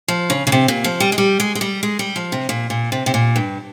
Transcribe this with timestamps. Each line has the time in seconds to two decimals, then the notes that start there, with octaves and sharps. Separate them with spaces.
0.08 F3
0.30 C#3
0.47 C#3
0.52 C3
0.68 A#2
0.84 F3
1.00 G3
1.12 G#3
1.18 G3
1.40 G#3
1.55 G#3
1.61 G3
1.83 G#3
1.99 G3
2.16 F3
2.32 C3
2.49 A#2
2.70 A#2
2.92 C3
3.06 C3
3.14 A#2
3.36 G2